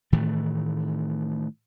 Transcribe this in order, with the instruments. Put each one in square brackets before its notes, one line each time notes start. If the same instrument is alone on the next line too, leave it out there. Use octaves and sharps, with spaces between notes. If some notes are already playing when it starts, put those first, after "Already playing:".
[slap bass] A2 D#3 E3 A3